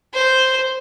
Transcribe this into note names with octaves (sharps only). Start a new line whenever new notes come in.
C5